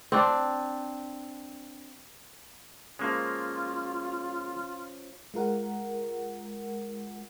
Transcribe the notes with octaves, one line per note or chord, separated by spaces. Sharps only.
C4 D4
F3 G#3 A#3 C#4 F4
G#3 F4 A#4 F#5